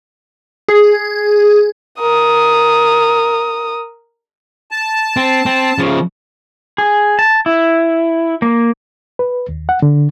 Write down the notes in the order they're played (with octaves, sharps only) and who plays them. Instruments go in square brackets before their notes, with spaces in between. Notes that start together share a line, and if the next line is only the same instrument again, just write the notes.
[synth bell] G#4
[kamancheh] A#4 D#6
[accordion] A5
[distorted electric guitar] C4
C4
C#3 F3
[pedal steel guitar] G#4
A5
E4
A#3
[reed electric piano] B4
D#2
F#5
D3